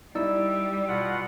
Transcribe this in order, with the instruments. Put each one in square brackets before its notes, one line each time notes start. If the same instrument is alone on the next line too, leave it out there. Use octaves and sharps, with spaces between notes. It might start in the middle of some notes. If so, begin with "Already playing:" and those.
[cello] G3 [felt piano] D#4 E4 [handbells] D5 E6
[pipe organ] B2 F4 F#5